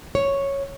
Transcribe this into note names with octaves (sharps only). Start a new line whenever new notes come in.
C#5